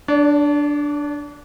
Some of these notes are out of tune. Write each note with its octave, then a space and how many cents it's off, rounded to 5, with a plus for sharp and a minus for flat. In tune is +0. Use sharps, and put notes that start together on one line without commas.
D4 +0 D5 -40